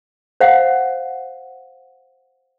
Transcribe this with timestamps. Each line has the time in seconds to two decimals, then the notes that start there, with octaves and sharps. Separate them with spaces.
0.40 C5 F5 F#5